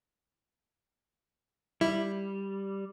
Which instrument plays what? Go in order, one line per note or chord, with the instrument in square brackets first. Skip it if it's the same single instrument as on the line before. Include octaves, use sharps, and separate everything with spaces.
[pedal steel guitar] G3 [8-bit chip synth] E4